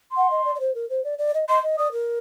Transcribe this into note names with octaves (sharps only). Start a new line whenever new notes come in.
C6
F#5
D#5
D5
D5
C5
A#4
C5
D5
D5
D#5
D#5 C6
D#5
D5 D#6
A#4